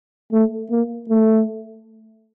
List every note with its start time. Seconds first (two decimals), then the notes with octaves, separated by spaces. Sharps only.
0.33 A3
0.71 A#3
1.09 A3